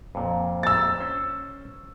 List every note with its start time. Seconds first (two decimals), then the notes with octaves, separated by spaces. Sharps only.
0.15 F2 A#2
0.63 E6 A6
1.00 C#4 C5